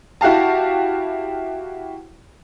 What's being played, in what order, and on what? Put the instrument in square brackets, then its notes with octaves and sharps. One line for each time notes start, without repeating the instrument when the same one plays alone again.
[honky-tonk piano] E4 F#4 G4 F5 A5